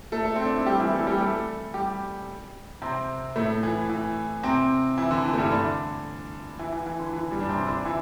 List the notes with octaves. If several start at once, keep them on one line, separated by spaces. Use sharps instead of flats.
A3 A4
A3
C4
D4
E4
G3 G4
E3 E4
A3 A4
G3 G4
A3 A4
G3 G4
C3 C4
A2 A3
E3
E3
C3 C4
E3 E4
D3
E3
A3
G2 G3
D3 D4
E3 E4
E3
E3
D3
E3
G2 G3
D4
C3 C4
D3 D4
E3 E4